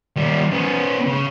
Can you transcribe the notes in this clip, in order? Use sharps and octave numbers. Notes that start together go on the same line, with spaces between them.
D#3 G3
B3 C#4
C#3